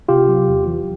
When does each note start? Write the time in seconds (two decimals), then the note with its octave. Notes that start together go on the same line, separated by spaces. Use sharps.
0.08 C3 F4 G4
0.28 F#3
0.48 E2
0.67 E3